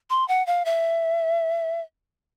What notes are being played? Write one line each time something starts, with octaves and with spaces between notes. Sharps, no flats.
C6
F#5
F5
E5